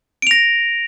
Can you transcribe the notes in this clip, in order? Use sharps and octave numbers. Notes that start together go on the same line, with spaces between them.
A#6 D7 F7